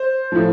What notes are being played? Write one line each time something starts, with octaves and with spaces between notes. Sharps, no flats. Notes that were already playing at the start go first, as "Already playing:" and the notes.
Already playing: C5
A2 F3